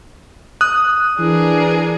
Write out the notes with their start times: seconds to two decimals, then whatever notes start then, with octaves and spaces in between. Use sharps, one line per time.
0.61 D#6 F#6
1.19 E3 D4 G#4 A#4